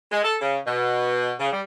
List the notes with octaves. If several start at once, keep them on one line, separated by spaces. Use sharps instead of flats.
G#3
A4
C#3
B2
C#3
G3